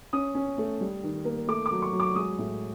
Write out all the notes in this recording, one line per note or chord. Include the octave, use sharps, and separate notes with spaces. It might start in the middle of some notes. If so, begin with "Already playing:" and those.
C#4 D#6
C#4
A3
G3
D#3
A#3
A3 D6
D6
F#3
C#6
F#3
D6
G#3 D#6
A2